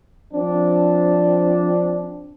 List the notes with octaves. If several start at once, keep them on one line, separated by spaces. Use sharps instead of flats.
F3 C4 D4